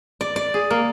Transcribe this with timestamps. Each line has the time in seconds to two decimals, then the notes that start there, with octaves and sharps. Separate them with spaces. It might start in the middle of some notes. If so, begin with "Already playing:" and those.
0.21 D5
0.36 D5
0.54 G#4
0.71 A#3